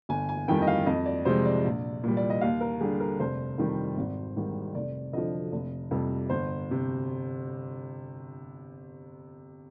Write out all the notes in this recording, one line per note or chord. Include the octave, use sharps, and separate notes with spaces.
G1 G#5
G#5
F2 D#3 G3 G5
D#5
F5
F2 D#5
D5
C3 F3 G#3 C5
D5
A#1
A#2 G3
D5
D#5
D#2 F5
A#4
D3 G3 G#4
A#4
F1 C5
F2 D#3 G3
G#1
G#2 D#3 G3
F1 D5
F2 D3 F3 D#5
F1
F2 C3 G3
G1 C5
C3